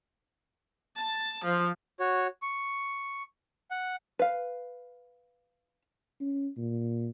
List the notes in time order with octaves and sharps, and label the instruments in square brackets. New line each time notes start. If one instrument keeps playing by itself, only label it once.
[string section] A5
F3
[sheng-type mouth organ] F#4 C#5
C#6
F#5
[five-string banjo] B4 F5
[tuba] C#4
A#2